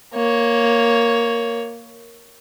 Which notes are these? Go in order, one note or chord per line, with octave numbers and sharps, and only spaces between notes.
A#3 C#5